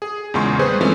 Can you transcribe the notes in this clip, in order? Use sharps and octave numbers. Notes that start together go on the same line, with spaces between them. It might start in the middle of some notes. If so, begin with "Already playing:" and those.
G#4
E2 A#2 C#3 G#3 C6 C#6
G3 G#4 B4 C5
E3 F3 G#3 A3 C4 C#4